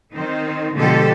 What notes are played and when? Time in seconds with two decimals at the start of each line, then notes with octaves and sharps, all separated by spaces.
0.14 D#3 C4 D#4
0.75 B2 D3 F3 G#3 G4 A4